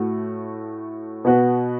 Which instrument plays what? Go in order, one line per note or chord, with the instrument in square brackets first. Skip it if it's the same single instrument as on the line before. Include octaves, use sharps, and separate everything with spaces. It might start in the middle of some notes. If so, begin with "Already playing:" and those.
Already playing: [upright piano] A2 A3 F#4
B2 B3 F#4 B4